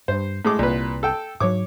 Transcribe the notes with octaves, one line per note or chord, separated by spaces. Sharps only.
G2 C5
A2 G#3 D6
C2 A#2 B4
A4 G5
G#2 F#3 C#5 D6